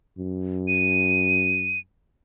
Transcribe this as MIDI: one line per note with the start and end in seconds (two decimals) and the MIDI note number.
0.19 1.82 42
0.68 1.79 99